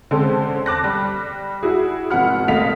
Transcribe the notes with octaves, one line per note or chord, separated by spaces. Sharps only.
D3 G#3 C4 C#4 A4 C5
A5 D6 F#6 A#6
G3
E4 F#4 G#4
G#1 B2 F3 F#5 B5 F6
G#1 A3 D#5 F5 B6 F7